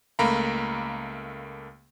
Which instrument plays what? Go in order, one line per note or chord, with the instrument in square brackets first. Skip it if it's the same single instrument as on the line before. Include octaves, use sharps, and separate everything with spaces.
[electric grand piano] C#2 A3 A#3 F5 A#5 B5